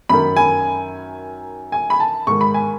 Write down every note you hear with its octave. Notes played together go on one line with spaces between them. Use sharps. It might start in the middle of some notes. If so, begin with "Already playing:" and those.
F#2 D#3 B5
G#5
G#5
B5
A5
G#2 D#3 C#6
B5
G#5